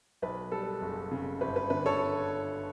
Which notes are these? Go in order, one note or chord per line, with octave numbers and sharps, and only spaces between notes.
B1 B4
G3 A4
F#1
C#3
G1 B4
B4
D3 B4
A4 C#5